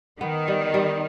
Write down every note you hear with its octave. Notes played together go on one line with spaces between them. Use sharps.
D#3 B3
G3
G3